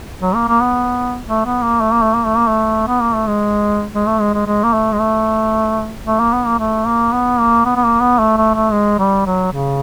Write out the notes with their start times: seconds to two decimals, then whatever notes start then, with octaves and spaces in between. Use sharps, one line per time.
0.21 F#3
0.35 A#3
0.48 A#3
0.62 B3
1.27 A3
1.45 B3
1.63 A#3
1.80 A3
1.92 A#3
2.03 A3
2.14 A#3
2.26 A3
2.37 A#3
2.47 A3
2.88 B3
3.01 A#3
3.14 A3
3.27 G#3
3.94 G#3
4.07 A3
4.20 G#3
4.34 G#3
4.46 G#3
4.64 A#3
4.73 A3
4.92 G#3
5.00 A3
6.06 A3
6.19 A#3
6.33 B3
6.46 A#3
6.59 A3
6.86 A#3
7.13 B3
7.40 A#3
7.65 B3
7.76 B3
7.84 A#3
8.01 B3
8.18 A3
8.37 A3
8.55 A3
8.72 G#3
8.99 G3
9.26 F#3
9.52 C#3